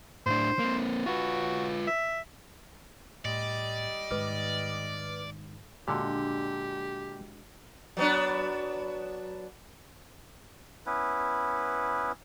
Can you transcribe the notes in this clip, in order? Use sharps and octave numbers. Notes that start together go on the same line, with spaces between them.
A2 D4 C5
A#3 C4
F4 F#4 B4
E5
A2 G3 D5 D#5
G#2 D#3 B4 D6 F6
A#2 D3 G#3 D4 F#4 G4
F#3 B3 D4
B3 C#4 E4 B4